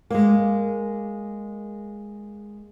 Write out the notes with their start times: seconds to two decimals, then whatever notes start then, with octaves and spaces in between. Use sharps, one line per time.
0.10 G#3 A#3